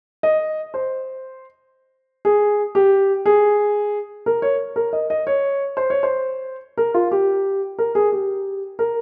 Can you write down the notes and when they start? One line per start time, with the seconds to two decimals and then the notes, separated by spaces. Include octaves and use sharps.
0.23 D#5
0.74 C5
2.25 G#4
2.75 G4
3.26 G#4
4.26 A#4
4.42 C#5
4.76 A#4
4.93 D#5
5.10 D#5
5.27 C#5
5.77 C5
5.90 C#5
6.03 C5
6.77 A#4
6.94 F4
7.11 G4
7.79 A#4
7.95 G#4
8.12 G4
8.79 A#4